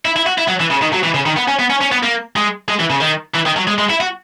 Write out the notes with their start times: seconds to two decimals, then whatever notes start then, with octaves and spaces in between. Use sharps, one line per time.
0.05 E4
0.16 E4
0.26 F#4
0.38 E4
0.48 F#3
0.60 E3
0.71 C#3
0.82 D#3
0.93 F#3
1.03 E3
1.14 C#3
1.26 D#3
1.36 B3
1.48 C#4
1.59 B3
1.70 C#4
1.81 C#4
1.91 B3
2.03 A#3
2.36 G#3
2.69 G#3
2.80 E3
2.91 C#3
3.01 D#3
3.35 E3
3.46 D#3
3.57 F#3
3.67 G#3
3.79 G#3
3.90 E4
4.01 F#4